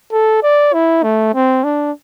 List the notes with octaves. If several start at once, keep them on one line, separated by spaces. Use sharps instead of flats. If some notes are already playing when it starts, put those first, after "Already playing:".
A4
D5
E4
A3
C4
D4